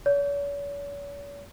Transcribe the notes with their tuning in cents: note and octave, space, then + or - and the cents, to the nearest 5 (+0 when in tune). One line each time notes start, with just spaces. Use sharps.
C#5 +45